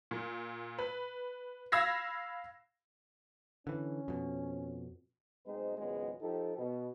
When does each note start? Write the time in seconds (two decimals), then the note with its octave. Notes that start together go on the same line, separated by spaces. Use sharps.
0.11 A#2
0.79 B4
1.72 F5 B5 E6 G#6 A#6 C7
3.67 D3 E3 C#4
4.08 F2 B2
5.46 B1 G#3 C4 D#4 C5
5.78 G#1 C#2 F#3 G#3 B3
6.21 F3 D#4 G4 A4
6.57 B2